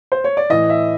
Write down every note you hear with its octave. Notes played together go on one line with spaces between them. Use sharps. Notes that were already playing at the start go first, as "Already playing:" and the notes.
C5
C#5
D5
A2 E3 D#5
E5